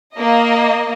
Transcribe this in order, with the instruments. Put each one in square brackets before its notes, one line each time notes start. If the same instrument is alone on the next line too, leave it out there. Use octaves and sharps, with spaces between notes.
[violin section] A#3 D#5